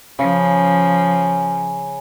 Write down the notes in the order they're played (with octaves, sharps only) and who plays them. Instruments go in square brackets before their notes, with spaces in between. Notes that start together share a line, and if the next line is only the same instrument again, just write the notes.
[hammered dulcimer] C#3 [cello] F3